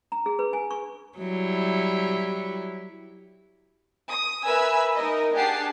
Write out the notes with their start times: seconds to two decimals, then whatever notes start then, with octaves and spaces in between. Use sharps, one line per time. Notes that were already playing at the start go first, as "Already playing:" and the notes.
0.12 A#5
0.26 G#4
0.39 B4
0.53 G#5
0.71 C#6
1.18 F#3 G3 E4
4.08 D#6
4.44 A#4 B4 E5 G#5 B5 E6
4.95 D#4 A#4 D#5
5.34 D4 G4 G#4 F#5 A5 C7